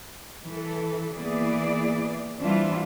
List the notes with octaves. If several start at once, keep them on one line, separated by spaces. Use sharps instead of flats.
E3 A4
E3 A#3 B3 E4 G#4 D5
E3 G3 C4 D4 E4 F4